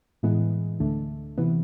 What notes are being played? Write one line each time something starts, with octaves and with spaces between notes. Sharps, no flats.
A2 E3 G#3 B3
D2 D3 A3
C3 E3 B3